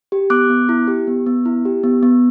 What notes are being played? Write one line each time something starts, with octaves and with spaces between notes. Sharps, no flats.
G4
B3 D6 F#6
B3
E4
G4
B3
B3
E4
G4
B3
B3